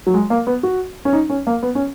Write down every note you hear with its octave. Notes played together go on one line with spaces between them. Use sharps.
F#3
G#3
A#3
B3
F#4
C#4
D#4
C#4
A#3
B3
C#4